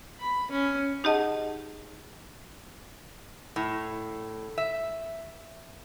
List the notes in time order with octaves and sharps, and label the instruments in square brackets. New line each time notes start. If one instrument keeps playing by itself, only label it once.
[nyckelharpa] B5
C#4
[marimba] D#4 G4 G#4 D#5 F#5 A5
[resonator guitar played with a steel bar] A2
E5